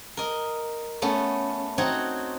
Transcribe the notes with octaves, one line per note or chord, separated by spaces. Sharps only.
A#4 D#5
A3 B3 C#4
C4 D#4 F#4 C#5